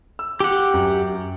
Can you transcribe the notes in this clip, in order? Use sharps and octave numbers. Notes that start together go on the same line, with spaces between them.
E6
G4 F#5
F#2